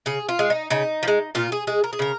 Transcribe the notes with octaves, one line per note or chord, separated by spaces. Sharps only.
C#3 G#4
F4
G#3
D#4
C#3 D#4
F3
G#3
A#2 F4
G#4
G#3 G#4
A#4
G#4
C#3 A#4